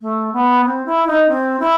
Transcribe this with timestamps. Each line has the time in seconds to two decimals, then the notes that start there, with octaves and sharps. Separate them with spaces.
0.01 A3
0.33 B3
0.65 C4
0.85 E4
1.07 D#4
1.28 C4
1.59 E4